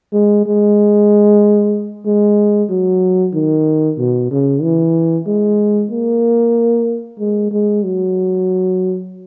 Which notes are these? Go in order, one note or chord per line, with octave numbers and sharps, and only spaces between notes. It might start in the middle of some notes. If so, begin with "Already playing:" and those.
G#3
G#3
G#3
F#3
D#3
B2
C#3
E3
G#3
A#3
G#3
G#3
F#3